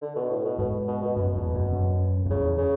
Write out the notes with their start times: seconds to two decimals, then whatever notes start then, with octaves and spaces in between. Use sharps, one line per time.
0.02 D3
0.16 B2
0.30 A2
0.45 B2
0.58 G#2 B2
0.88 B2
1.02 B2
1.16 F#2 B2
1.35 E2
1.54 F#2
1.73 F#2
2.26 F#2
2.30 E2 C#3
2.58 C#3